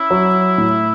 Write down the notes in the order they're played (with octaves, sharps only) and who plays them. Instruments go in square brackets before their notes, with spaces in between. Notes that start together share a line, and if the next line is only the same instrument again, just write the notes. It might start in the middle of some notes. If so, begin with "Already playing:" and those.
Already playing: [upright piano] C#4 [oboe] E4
[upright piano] F#3
A2